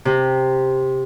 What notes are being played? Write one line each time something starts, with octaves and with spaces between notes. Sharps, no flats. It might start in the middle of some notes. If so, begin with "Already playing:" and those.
C3